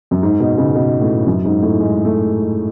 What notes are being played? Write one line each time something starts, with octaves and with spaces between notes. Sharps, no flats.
F#2
G#2
B2
C#3
B2
A2
F#2
G#2
A2
G#3
A3